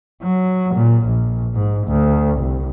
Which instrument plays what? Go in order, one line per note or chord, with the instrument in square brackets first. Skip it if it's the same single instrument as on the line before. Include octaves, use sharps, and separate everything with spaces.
[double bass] F#3
A#2
A#1
G#2
D2
C2